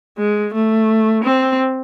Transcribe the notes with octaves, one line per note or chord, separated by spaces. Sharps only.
G#3
A3
C4